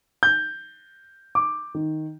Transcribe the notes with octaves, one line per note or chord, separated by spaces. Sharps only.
G6
D6
D#3